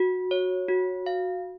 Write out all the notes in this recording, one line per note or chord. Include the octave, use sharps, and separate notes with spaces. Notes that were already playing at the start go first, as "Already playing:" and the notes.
Already playing: F#4
C#5
F#4
F5